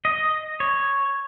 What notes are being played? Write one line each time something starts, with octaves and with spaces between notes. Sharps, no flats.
D#5
C#5